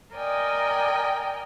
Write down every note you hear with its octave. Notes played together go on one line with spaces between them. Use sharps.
A#4 D5 D#5 G5 G#5